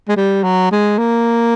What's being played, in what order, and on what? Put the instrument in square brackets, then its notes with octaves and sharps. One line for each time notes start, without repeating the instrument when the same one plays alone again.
[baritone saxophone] G#3
G3
F#3
G#3
A#3